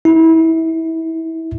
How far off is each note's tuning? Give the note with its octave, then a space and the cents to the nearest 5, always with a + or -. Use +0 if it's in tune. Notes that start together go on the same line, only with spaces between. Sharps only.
E4 -25